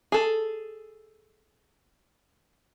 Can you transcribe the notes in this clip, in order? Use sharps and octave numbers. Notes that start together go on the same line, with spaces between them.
G#4 A4